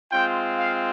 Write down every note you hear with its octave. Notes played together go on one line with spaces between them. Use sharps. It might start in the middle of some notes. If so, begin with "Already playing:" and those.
G#3 C4 F4 G5
F5